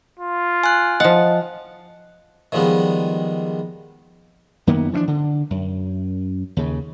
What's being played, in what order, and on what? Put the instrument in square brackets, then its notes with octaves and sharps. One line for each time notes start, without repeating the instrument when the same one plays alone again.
[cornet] F4
[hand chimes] G#5 F#6
[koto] F3 F#5 [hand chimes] D#5
[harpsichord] D#3 F3 G3 G#3 B3
[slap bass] F#2 D#3 A#3 B3
E3 F3 C4 D4
D3
F#2
D#2 C#3